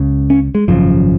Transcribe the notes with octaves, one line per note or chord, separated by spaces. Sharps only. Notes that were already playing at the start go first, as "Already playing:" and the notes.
Already playing: C#2 C#3
C#4
G#3
G#1 F#2 C#3 F3